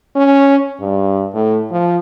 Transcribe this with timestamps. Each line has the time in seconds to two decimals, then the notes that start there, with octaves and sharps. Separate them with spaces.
0.16 C#4
0.80 G2
1.34 A2
1.71 F3